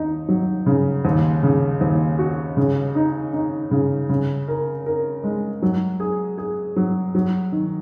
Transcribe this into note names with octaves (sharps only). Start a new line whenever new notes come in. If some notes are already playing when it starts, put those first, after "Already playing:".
Already playing: D#2 D#4
F#3
C#3
D#2
C#3
D#2
F#4
C#3
D#4
D#4
C#3
C#3
A#4
A#4
G#3
F#3
G#4
G#4
F#3
F#3
D#3